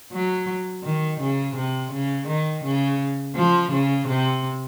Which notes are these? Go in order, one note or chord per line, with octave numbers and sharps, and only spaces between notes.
F#3
D#3
C#3
C3
C#3
D#3
C#3
F3
C#3
C3